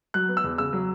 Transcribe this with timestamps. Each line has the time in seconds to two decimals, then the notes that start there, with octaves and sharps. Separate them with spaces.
0.14 F#3 F#6
0.29 B3
0.37 E6
0.44 E2
0.58 C#3 E6
0.73 F#3